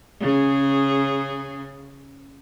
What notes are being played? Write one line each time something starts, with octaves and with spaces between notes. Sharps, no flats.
C#3 G#4